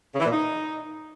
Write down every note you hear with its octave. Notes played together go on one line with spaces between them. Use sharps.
C#3
E3
A#2
D#4